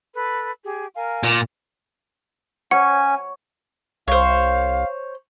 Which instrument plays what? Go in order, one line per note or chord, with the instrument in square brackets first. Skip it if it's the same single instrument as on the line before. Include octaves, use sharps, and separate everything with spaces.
[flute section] A4 B4
G4 G#4
A#4 F5 G#5
[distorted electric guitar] A#2
[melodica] C#4 G#5 [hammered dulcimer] C#5 [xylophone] F#5
[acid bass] C2 [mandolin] C5 C#5 [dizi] F5